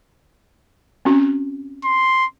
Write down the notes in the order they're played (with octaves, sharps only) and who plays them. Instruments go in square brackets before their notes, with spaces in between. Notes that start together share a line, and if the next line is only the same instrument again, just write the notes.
[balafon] C4 C#4 F#4
[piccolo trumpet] C6